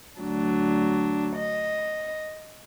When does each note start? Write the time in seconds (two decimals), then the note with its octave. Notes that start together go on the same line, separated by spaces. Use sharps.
0.20 D2 F#3 D4
1.35 D#5